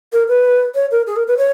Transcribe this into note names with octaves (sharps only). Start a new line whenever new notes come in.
A#4
B4
C#5
A#4
G#4
A#4
B4
C#5